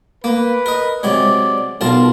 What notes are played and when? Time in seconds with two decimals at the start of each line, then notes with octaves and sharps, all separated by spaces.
0.24 A#3 B4
0.66 A#4 D#5
1.03 C3 F#3 G#3 D5
1.81 B1 F4 A#4 A5